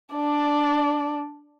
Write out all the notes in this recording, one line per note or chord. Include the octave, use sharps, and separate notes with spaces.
D4 D5